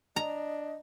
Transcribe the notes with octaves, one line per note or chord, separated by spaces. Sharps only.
D4 D#5 A#5